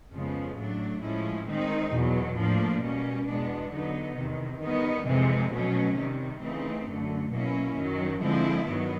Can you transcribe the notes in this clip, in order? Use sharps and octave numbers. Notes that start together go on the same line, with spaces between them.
F2 C#3 F3 G#3 B3
A2 F#3 A3 D4
A2 F3 G#3 C#4 E4
D#3 G#3 C4 D#4
E2 B2 F#3
A2 F3 A#3 D4
B2 G3 A#3 C#4
E2 B2 G#3 B3 D4
D3 F#3 B3 D#4
E2 C3 D#3
D#3 G3 B3 D#4
F2 C3 E3 G#3 C4
B2 F#3 A3 C#4
C3 D#3 G3
C#3 E3 A3 C4 D#4
F#2 D3 F#3 A3
B2 F#3 A#3 C#4 E4
F#2 D#3 F#3
D3 F3 G#3 C4 E4
G2 D#3 F#3 B3